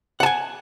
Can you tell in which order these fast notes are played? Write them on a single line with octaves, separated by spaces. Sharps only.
F#5 A5 G#5